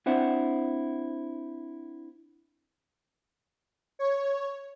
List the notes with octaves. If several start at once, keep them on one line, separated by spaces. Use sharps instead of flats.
C4 D4 E4 C5 F#5
C#5